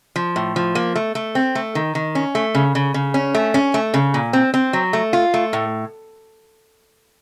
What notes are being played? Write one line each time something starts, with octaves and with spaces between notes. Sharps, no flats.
F3
A2
F3
A#3
A3
A3
C4
A3
D#3
D#3
C#4
A3
C#3
C#3
C#3
C#4
A3
C#4
A3
C#3
A#2
C4
C4
F#3
A3
F4
A3
A2